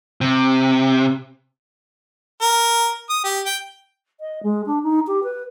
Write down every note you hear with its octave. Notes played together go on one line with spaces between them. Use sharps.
C3
A#4
D#6
G4
G5
D#5
G#3
D4
D#4
G4
B4